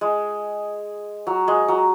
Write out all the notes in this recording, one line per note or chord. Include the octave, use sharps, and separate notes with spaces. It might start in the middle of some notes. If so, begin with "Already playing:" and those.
G#3
F#3
G#3
F#3